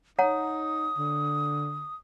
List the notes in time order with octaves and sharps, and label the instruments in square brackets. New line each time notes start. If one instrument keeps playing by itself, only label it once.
[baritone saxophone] D#4 [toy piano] C#5 F#5 A#5 [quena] D#6
[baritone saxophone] D3